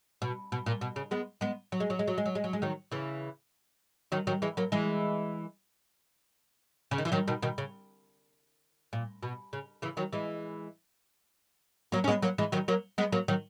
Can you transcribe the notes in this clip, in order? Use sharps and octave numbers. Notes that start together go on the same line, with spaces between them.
B2
B2
A#2
B2
C#3
G#3 B3
G#3 B3
F#3
G#3
F#3
G#3
F#3
G#3
F#3
G#3
F#3
G#3
D#3 F#3
C#3 E3
D#3 F#3
D#3 F#3
E3 G#3
F#3 A#3
E3 G#3
C#3
D#3
E3
D#3 F#3
B2 D#3
B2 D#3
C#3
A#2
B2
C#3
C#3 E3
D#3 F#3
E3 G#3
F#3 A#3
C#4
G#3 B3
F#3 A#3
E3 G#3
D#3 F#3
F#3 A#3
G#3 B3
F#3 A#3
D#3 F#3